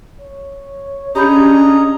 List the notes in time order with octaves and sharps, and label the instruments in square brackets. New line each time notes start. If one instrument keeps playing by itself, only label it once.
[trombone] C#5
[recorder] C#4 [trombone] D4 [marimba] G4 B5 G6 [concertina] G#4 D#5 A#5